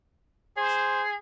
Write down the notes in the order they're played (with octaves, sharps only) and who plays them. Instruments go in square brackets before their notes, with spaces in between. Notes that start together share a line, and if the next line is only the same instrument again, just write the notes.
[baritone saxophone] G#4 [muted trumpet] C5